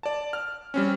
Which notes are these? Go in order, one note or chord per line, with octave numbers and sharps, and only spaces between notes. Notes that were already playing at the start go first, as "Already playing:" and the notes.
D5 A5
F6
G3 C4 C#4